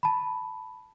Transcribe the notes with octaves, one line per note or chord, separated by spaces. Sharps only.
A5 B5